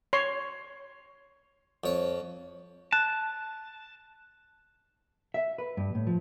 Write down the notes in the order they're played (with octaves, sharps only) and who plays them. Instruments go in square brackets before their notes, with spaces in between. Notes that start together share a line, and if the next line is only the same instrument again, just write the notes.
[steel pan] C#5 C6
[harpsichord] F2 C#5
[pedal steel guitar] A5 [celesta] F#6
[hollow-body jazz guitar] E5
B4
G2
A2
F3